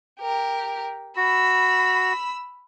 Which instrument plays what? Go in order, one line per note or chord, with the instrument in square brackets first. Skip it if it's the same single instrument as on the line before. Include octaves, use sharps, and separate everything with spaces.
[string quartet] G4 A#4
[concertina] F#4 [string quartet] B5 E6